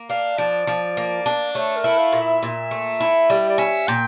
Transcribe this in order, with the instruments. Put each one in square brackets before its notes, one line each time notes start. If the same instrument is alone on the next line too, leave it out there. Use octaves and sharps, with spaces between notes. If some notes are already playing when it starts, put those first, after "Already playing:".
Already playing: [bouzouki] A#3
[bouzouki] D4 [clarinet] F5
[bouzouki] F3 [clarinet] D5
[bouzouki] F3
A#3
D4
[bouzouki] A3 [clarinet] C#5
[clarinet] A#4
[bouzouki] E4
[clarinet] F5
[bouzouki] A#2
[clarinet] E5
[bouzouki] A#2
A3
E4
[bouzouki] G3 [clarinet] D5
[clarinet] D5
[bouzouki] C#4 [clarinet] E5
[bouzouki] A#2 [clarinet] G5